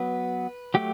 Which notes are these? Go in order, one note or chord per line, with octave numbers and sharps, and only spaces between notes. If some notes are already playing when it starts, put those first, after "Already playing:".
Already playing: F#3 B3 B4
F#3 A3 G4